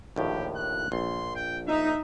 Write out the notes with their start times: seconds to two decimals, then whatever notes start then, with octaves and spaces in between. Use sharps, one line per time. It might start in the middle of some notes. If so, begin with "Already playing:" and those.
0.16 A#1 D#2 A2 G4
0.56 F#6
0.92 A#1 C6
1.36 G5
1.68 D#4 E5